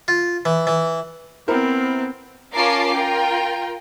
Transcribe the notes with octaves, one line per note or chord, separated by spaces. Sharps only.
F4
E3
E3
B3 C4 E4 A#4 C5
C#4 F4 A#4 A5 D6 C7
F4 A#4 G5